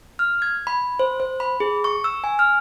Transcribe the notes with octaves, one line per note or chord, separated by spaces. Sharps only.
F6
G#6
B5
C5
C5
B5
G#4
C#6
E6
G#5
F6